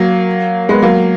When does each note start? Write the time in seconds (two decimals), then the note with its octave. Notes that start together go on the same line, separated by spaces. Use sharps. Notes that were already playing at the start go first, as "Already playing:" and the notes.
Already playing: F#3 A#3
0.69 G#3 B3
0.83 F#3 A#3